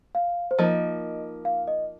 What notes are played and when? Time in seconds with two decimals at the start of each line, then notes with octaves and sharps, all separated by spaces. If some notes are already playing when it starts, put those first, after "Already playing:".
0.15 F5
0.51 C5
0.59 F3 A#3 D#4 D#5
1.45 F5
1.68 D#5